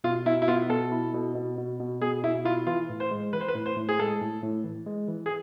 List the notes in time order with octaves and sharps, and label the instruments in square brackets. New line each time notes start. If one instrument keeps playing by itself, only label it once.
[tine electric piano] B2 [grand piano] F4
[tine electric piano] B2 [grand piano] E4
[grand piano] E4
[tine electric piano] B3 [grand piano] F4
[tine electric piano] B2 [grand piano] A4
[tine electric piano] E4
B2
B2
B2
B2
[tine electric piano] B2 [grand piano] G#4
[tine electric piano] B2 [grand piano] E4
[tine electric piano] E4 [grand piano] F4
[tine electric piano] E3 [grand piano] F4
[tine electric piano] A2
[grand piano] C5
[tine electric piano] G#3
[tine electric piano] E3 [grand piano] B4
[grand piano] C5
B4
[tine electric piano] A2
[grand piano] C5
[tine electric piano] A2
[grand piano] G#4
[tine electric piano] G#3 [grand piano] A4
[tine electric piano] A2
A2
E3
G#3
E3
[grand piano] G#4